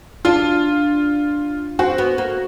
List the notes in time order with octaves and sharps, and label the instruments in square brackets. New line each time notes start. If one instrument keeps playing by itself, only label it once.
[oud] D4 [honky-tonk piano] F4
[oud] C4 [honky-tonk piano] F#4
[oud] B3
A#3